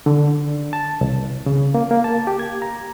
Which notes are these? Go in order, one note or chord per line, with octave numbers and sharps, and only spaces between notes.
D3
A5
C2
C#3
A#3
A#3
A5
G4
G#6
A#5